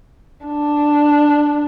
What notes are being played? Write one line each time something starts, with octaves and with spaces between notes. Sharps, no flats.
D4